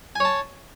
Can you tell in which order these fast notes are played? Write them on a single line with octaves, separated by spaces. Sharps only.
G#5 C#5 A5